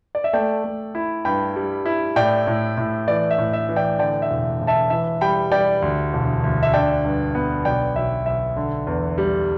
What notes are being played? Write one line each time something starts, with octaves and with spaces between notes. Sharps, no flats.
D5
E5
A3 D5 G5
A3
E4
G2 G5 B5
G3
E4
A2 D5 G5
A2
A2
E3 D5
E5
A2
E5
E3
D5 G5
D3 D5 G5
E5
E1
E1
E5 A5
E3 E5
G3 G5 B5
G3 D5 G5
D2
E1
D2
E5
D4 D5 G5
G2
B3
B1 D5 G5
B1 E5
B1 E5
D3
E2
G3